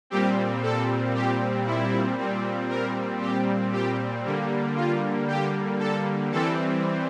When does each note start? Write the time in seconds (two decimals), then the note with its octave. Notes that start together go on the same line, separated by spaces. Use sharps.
0.10 A#2 G3 C4 G4
0.63 A4
1.15 G4
1.67 E4
2.18 A#2 G3 C4
2.69 A#4
3.21 G4
3.73 G4
4.25 D3 G3 A#3
4.76 F4
5.28 G4
5.79 A4
6.32 E3 G3 C4 A4